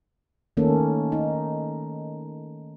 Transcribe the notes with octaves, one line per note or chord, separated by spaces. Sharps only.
D#3 A3 A#3 C#4 A4
D#4